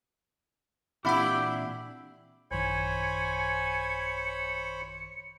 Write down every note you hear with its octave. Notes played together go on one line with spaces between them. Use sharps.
A#2 E3 C4 D4 E4 G4 F#5 E6
A1 F#2 D#3 C5 C#5 G#5 B5 C#7